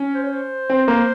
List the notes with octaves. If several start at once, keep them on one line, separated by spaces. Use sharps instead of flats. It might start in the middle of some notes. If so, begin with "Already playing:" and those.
Already playing: C#4
C5
C#5
C5
C4
A#3